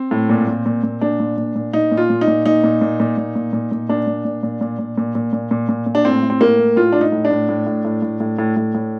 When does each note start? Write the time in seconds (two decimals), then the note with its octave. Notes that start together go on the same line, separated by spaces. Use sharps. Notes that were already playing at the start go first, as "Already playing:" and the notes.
Already playing: C4
0.11 A2
0.29 A#2
0.47 A#2
0.66 A#2
0.83 A#2
1.01 A#2 D4
1.20 A#2
1.37 A#2
1.56 A#2
1.73 A#2 D#4
1.92 A#2
1.97 F4
2.10 A#2
2.21 D#4
2.28 A#2
2.46 A#2 D#4
2.64 A#2
2.81 A#2
3.00 A#2
3.17 A#2
3.35 A#2
3.53 A#2
3.72 A#2
3.89 A#2 D4
4.07 A#2
4.25 A#2
4.43 A#2
4.61 A#2
4.79 A#2
4.98 A#2
5.15 A#2
5.33 A#2
5.51 A#2
5.69 A#2
5.86 A#2
5.95 D4
6.05 A2 C4
6.23 A2
6.30 C4
6.40 A2 A#3
6.59 A2
6.76 A2 F4
6.92 A2 D4
7.01 D#4
7.12 A2
7.25 D4
7.31 A2
7.49 A2
7.67 A2
7.85 A2
8.02 A2
8.20 A2
8.39 A2
8.57 A2
8.75 A2